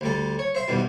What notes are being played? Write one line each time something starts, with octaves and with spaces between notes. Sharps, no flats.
D2 G3 A4
C#5
C5 E5 C6
E2 G2 B2 D#3 G3